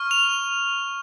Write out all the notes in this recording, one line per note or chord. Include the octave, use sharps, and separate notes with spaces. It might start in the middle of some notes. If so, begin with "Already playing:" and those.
Already playing: C#6 F6
F7